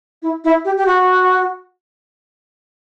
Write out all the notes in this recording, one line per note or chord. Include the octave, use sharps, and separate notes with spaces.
E4
E4
G4
G4
F#4